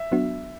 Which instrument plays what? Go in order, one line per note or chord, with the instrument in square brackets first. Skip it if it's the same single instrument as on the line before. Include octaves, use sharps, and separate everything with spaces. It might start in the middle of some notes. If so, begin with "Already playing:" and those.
Already playing: [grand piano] E5
[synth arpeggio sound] F#3 B3 D4 F#4